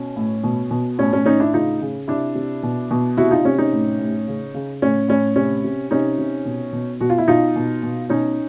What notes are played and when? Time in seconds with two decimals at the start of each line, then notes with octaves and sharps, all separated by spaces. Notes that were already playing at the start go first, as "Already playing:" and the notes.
Already playing: B2 C#4
0.16 A2
0.44 B2
0.71 B2
0.98 A2 C#4
1.13 C#4
1.26 A2 C#4 D#4
1.40 D4 E4
1.53 C#3 D#4 F4
1.81 C#3
2.08 C3 D4 E4
2.35 C3
2.63 B2
2.91 B2
3.17 C3 E4 F#4
3.31 D#4 F4
3.44 C3 C#4
3.58 C#4 D#4
3.73 A2
3.99 A2
4.27 C#3
4.54 C#3
4.82 A2 C#4
5.08 A2 C#4
5.36 C3 C#4
5.64 C3
5.91 C3 C#4 D#4
6.18 C3
6.45 B2
6.73 B2
7.01 B2 F#4
7.10 F4
7.18 E4
7.28 B2 D#4 F4
7.56 B2
7.83 B2
8.10 B2 C#4 D#4